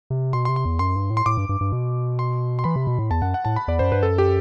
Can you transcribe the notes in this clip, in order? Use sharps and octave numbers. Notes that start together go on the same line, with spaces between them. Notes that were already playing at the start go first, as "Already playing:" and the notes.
C3
B2 C6
C6
C3
C6
E2
F#2 C6
G2
A2
C6
A2 D6
G2
G2
G2
B2
C6
C6
E3 B5
C3
B2
A2
E2 A5
F#2 F#5
F#5
A2 A5
B5
E2 D5
F#2 C5
G2 B4
F#2 A4
G4